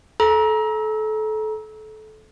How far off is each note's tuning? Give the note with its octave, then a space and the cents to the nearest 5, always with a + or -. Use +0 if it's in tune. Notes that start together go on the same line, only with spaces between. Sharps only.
A4 -25 A#5 +25